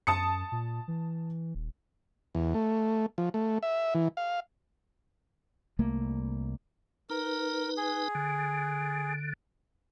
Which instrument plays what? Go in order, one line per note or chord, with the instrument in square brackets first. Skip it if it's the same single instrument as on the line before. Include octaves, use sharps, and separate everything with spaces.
[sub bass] F#2 [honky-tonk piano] A5 D#6 C#7
[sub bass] A#2
E3
D#1
[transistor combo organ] E2
A3
F3
A3
E5
E3
F5
[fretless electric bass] C2 A3 A#3
[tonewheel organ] D#4 B4 [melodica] A#4
[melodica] G#4
[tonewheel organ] D3